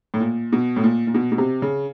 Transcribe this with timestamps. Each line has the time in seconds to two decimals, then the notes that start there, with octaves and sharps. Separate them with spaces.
0.14 A2
0.20 A#2
0.53 B2
0.76 A2
0.84 A#2
1.07 A#2
1.14 B2
1.32 B2
1.38 C3
1.62 C#3